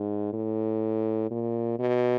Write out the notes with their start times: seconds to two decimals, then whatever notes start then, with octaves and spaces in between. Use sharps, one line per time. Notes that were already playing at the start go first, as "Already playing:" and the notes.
Already playing: G#2
0.33 A2
1.31 A#2
1.80 B2